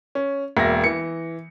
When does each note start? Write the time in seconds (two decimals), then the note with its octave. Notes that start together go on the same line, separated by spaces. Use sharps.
0.15 C#4
0.57 E1 A#3 E5 A#6
0.84 E3 C#7